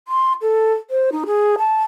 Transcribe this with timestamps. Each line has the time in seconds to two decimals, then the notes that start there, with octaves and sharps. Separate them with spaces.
0.08 C6
0.42 A4
0.90 C5
1.12 D#4
1.26 G#4
1.58 A5